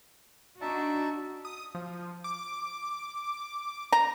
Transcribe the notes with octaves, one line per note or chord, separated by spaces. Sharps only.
D4 D#4 F#4 E5 A5
D#6
F3
D6
A#5